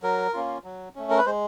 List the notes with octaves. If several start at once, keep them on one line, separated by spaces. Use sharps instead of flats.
F#3 A#4
A#3 C#4 F4
F#3
A3 C#4
A#4
B4
G#3 C5